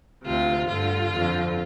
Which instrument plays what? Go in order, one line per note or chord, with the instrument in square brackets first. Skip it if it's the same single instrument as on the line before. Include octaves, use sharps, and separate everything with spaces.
[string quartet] D2 C3 F4
G2 D3 F4
F2 D3